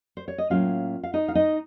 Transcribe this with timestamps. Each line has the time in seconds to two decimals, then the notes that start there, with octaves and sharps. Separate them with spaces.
0.17 C5
0.28 C#5
0.38 D#5
0.50 A2 F#3 A#3 C#4 F4 F5
1.03 F5
1.14 D#4 D#5
1.28 F5
1.35 D#4 D#5